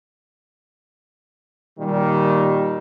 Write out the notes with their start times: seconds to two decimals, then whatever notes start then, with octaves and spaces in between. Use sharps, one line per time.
1.78 A#2 D#3 G3